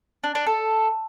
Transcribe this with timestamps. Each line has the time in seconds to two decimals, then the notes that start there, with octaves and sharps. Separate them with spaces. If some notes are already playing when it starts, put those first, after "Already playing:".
0.24 D4
0.35 D4
0.46 A4